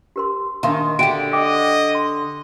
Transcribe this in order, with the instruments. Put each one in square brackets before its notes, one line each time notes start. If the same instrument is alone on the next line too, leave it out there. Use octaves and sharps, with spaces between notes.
[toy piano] G4 A#4 C6
[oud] D#3 [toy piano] D4 A#4 A5 [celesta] E5 F5 C6
[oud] D3 G4 [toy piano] F#4 E5 G5 [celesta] D7
[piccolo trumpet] D#5 [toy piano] G5 [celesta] D6
[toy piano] C6